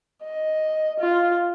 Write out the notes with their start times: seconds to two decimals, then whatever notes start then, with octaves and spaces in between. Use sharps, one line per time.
0.23 D#5
1.00 F4